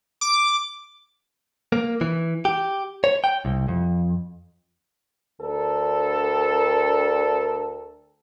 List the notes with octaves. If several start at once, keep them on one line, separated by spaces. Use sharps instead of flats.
D6
A#3
E3
G4
C#5
G5
C2
F2
D2 D3 A4 A#4